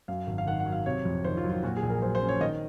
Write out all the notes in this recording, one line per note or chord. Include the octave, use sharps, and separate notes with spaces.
F#2 F5
G#1
F5
D#3 F#5
F#5
F#3
F5
C3 C#5
F2
D#3 C5
F4
F#3
F4
A#2 F#4
G#4
A#1
A#4
F#3 C5
C5
C#4
C#5
D#3 D#5